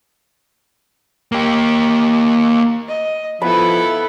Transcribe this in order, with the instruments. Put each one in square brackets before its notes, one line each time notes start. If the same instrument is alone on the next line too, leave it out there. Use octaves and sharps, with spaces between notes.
[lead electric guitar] A#3 G4
[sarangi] D#5
[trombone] F3 [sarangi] B3 [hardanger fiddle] E4 A4 [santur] B5